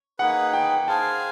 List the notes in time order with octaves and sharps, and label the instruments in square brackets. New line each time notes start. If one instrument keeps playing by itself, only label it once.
[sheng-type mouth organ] A#3 D#4 G#4 B4 [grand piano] F#5
[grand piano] G5
[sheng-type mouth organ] G#4 C5 F5 G#5 [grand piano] A5